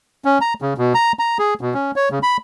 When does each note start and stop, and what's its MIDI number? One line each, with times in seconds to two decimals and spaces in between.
0.25 0.39 61
0.41 0.54 82
0.62 0.74 49
0.78 0.93 47
0.94 1.12 82
1.19 1.38 82
1.39 1.54 68
1.61 1.74 47
1.74 1.91 61
1.96 2.09 73
2.11 2.19 49
2.23 2.37 83